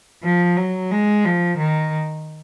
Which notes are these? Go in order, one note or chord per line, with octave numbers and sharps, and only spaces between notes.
F3
F#3
G#3
F3
D#3